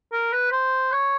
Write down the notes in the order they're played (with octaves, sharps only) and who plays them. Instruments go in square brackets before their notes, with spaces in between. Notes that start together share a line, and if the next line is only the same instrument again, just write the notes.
[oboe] A#4
B4
C5
C#5